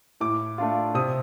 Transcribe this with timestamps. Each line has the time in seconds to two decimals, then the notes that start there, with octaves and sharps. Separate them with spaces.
0.20 A2 D6
0.58 A3 D4 F4
0.95 C3 D#6